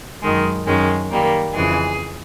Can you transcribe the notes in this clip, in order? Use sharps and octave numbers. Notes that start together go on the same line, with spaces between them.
F#2 D#3 G#3
F#2 D#3 G#3 C#4
D#3 G3 A#3
F2 C#3 E3 G#3 G#4